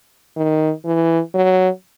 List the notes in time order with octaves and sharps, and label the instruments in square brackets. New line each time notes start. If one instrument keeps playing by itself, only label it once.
[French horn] D#3
E3
F#3